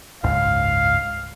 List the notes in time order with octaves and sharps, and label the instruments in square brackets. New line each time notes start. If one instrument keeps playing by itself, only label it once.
[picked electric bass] F#1 C#2 G#2 [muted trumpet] F5